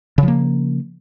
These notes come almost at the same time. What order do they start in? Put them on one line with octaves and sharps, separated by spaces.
C#3 F3 A#3